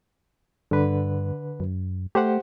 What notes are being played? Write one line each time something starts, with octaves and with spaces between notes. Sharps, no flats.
G2 D3 B4
F#2
A3 G4 C5 F#5